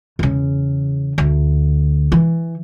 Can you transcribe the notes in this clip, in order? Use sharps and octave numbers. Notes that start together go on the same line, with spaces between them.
E2 C#3
D2
E3